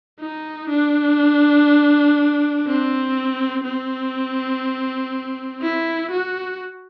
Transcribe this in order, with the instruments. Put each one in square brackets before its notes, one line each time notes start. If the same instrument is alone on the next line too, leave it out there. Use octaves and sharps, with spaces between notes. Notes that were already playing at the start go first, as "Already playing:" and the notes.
[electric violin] D#4
D4
C4
C4
E4
F#4